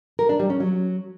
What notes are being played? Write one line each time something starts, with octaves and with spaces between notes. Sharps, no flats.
A#4
D4
G3
C#4
F#3